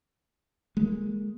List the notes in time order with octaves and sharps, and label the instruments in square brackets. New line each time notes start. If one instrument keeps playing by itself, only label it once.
[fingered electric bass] G#3 A#3